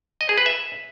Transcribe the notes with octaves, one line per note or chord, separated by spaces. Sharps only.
D#5
G#4
B4
E5